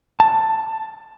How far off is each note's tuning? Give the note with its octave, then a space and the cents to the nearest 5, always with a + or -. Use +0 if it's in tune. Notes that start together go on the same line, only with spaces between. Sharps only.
A5 +10